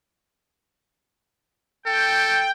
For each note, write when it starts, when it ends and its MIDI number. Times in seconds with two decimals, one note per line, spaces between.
1.86 2.48 69
1.86 2.51 79